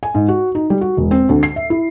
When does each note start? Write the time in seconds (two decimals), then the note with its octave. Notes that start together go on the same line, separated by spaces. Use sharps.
0.03 G#5
0.15 G#2
0.28 F#4
0.55 D#4
0.70 G3
0.81 F#4
0.97 E1
1.11 C4
1.29 D2
1.43 C7
1.56 E5
1.70 E4